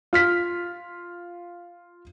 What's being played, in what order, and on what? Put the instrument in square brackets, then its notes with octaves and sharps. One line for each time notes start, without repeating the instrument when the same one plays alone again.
[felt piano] F4 F6 B6